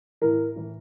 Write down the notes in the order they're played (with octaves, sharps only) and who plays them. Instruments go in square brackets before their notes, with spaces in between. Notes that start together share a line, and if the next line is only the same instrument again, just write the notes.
[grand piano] A2 E3 A#4
A2 E3